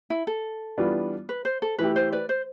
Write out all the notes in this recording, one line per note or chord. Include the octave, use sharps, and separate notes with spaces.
E4
A4
E3 G3 B3 D4 F4
B4
C5
A4
E3 A3 E4 G4 B4
C5
B4 D5
C5